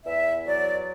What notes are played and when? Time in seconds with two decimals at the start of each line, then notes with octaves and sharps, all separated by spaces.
0.05 E2 E5
0.45 F#3 D5